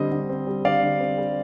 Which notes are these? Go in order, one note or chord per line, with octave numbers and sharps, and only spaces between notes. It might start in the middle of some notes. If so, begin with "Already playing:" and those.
Already playing: D3 G3 C4 D#5
D3
C4
G3
D3 D5 F5
D3
C4
G3